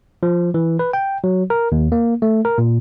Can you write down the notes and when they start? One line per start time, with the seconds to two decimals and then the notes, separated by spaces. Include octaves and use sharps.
0.23 F3
0.54 E3
0.79 B4
0.93 G5
1.24 F#3
1.50 A#4
1.72 D#2
1.92 A#3
2.22 A3
2.45 A#4
2.58 A#2